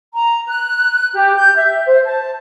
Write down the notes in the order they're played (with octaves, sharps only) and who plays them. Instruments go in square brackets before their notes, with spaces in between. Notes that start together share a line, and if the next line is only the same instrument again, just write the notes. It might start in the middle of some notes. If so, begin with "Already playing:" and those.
[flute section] A#5
F#6
G4
G6
E5
C5
A5